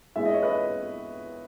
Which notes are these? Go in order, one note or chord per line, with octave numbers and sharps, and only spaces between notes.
E2 B2 G#3 E5
D#5
C#5
B4 D#5